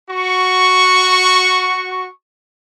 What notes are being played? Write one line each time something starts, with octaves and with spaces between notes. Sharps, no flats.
F#4 C#6